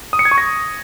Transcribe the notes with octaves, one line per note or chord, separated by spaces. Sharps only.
D#6
C#7
G#6
C#6
A#6